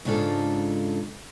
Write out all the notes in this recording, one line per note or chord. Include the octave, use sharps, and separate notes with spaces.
G#2 C#3 D4 F4 A4